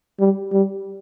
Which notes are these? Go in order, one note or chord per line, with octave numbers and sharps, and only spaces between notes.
G3
G3